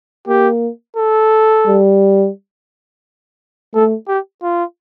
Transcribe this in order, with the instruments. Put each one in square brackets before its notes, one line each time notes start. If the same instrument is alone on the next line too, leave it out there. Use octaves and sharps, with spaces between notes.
[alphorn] A#3 [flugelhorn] G4
[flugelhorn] A4
[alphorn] G3
[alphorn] A3 [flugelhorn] A4
[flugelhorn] G4
F4